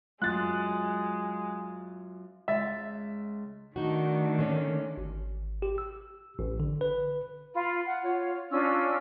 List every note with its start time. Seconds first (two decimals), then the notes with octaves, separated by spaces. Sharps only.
0.22 F#2 G#3 F4 F#6 A6
2.48 C#2 G#3 E5 A6
3.76 D#3 A3 D4 D#4 F#4
4.39 D3 A#3 C#4
4.97 G#1
5.62 G4
5.78 E6
6.39 A1
6.60 D3
6.81 B4
7.54 F4 B5
7.85 F#5
8.03 F4 C#5
8.51 C#4 D4 F4 E6